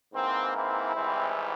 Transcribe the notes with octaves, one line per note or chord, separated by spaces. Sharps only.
G#2 E3 A#3 C4
C4 E4
G#1 G#2 E3 G3 C4